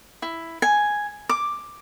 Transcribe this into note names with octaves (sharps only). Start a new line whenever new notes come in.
E4
G#5
D6